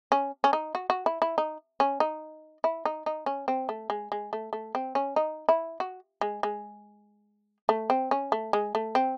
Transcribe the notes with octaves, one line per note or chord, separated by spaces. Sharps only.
C#4
C#4
D#4
F#4
F#4
E4
E4
D#4
C#4
D#4
E4
D#4
D#4
C#4
C4
A3
G#3
G#3
A3
A3
C4
C#4
D#4
E4
F#4
G#3
G#3
A3
C4
C#4
A3
G#3
A3
C4